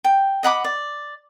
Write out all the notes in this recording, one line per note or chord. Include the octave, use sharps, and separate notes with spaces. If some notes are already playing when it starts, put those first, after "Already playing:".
G5
D#5 F#5 B5 D6
D5